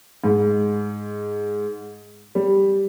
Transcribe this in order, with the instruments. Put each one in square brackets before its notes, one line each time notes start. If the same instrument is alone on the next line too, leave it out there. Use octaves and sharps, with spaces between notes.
[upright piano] G#2
G3